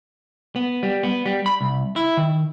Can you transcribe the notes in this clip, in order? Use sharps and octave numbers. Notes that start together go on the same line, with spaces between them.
B3
G3
B3
G3
B5
C2
E4
D#3